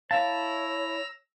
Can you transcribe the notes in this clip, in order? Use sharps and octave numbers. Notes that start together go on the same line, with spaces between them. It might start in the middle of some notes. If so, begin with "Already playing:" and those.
E4 C#5 E5 F5 A5 A#5 E6